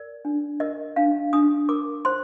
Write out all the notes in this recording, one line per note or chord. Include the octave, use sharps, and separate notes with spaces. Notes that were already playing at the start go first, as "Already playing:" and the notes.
Already playing: A#4 D5
D4
A#4 D#5
D4 F5
D4 D#6
A#4 D6
C5 C6